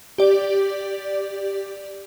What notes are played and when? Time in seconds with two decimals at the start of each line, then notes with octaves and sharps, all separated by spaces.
0.18 G4 D5